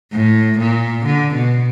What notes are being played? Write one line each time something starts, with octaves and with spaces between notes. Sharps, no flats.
A2
A#2
D3
B2